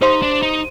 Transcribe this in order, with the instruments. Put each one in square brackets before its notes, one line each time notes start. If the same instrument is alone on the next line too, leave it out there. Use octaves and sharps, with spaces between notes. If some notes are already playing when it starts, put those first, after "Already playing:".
[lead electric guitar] D#4 [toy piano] G4 C5 F5 C6
[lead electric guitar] D4
D#4